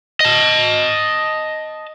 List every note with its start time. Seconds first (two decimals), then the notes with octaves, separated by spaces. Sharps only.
0.20 D#5 A5